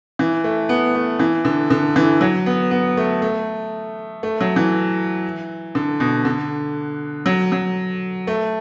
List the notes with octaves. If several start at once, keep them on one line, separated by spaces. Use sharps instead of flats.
E3
A3
B3
A3
E3
D3
D3
E3
F#3
B3
B3
A3
A3
A3
F#3
E3
D3
B2
D3
F#3
F#3
A3